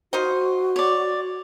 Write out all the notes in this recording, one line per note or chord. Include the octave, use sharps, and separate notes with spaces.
D#4 F4 F#4 C5
C#5 D5